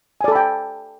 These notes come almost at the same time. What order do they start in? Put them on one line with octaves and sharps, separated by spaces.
G#5 D5 A4 B5 G5